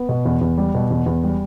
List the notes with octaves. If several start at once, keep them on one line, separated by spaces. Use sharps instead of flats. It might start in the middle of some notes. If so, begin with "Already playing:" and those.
Already playing: B3
B2
E2
E2
G3
B2
E2
E2
G3